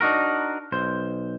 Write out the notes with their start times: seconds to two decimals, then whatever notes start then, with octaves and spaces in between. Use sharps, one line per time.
0.01 D4 D#4 F#4 A#4
0.72 B1 C5